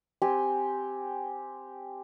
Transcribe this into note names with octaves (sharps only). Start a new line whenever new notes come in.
C4 G4 G#5